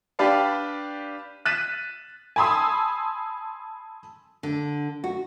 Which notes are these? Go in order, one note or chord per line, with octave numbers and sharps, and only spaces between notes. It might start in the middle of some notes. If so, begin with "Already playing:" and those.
D4 G4 B4 D5 F5 A5
F#6 A6 B6 D#7 E7
G#5 A5 B5 C6 D#6 E6
D3
F#4